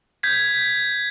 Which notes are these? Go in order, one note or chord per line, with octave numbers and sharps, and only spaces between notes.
G6 G#6 B6